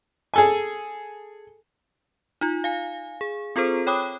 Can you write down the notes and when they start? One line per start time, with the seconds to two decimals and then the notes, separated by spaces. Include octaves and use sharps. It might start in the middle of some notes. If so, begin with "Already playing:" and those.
0.34 G#4 A4 G#5
2.41 D#4 F4
2.64 F5 G#5
3.21 G#4
3.56 C4 F4 G#4 A4 C5
3.87 C#5 G5 B5 D6 D#6 F#6